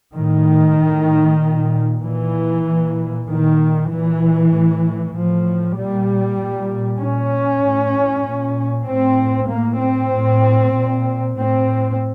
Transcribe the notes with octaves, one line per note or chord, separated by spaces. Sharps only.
A2 D#3
A2
A#2
A#2 E3
A#2
A#2 D#3
A#2 E3
A2
A2 F3
A#2 G3
A#2
A#2 C#4
A2
A#2
A2 C4
A2 A#3
C4
A2
A#2
A2 C4